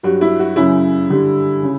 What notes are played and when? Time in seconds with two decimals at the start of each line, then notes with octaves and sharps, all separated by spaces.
0.03 G2 F#3 F#4
0.21 E4
0.39 F#4
0.56 F#2 C#3 F#3 E4
1.10 G2 D3 G3
1.63 C#3